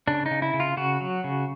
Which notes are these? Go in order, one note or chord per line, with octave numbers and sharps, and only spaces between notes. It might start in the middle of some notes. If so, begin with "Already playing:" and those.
C#3 D4
D#4
C#3
E4
C#3
F4
C#3 F#4
F#3
C#3